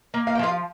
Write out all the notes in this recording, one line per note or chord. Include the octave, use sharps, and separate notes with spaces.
A#3
F5
G5
F3 F4 F5